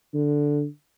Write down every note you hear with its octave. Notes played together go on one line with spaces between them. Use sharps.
D3